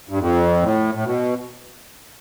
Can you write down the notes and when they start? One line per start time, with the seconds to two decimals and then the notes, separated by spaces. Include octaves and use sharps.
0.09 G2
0.20 F2
0.62 A2
0.95 A2
1.05 B2